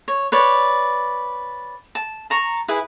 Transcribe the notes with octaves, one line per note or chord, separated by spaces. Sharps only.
C#5
B4 C#5 D5
A5
A5 A#5 C#6
E4 G#4 B4